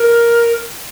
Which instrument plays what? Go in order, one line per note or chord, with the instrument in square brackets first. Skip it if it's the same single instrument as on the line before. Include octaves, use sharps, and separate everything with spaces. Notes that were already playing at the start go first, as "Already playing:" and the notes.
Already playing: [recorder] A#4